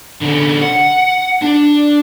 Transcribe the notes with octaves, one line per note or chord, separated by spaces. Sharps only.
D3 C#4
F#5
D4